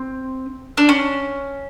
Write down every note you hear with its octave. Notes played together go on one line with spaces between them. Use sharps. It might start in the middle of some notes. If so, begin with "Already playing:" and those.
Already playing: C4
D4
C#4